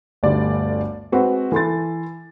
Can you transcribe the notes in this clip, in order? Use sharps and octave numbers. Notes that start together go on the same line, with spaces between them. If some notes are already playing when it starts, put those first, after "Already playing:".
G1 D2 G3 D5
G#3 C4 F#4 B4
E3 A4 C6 A6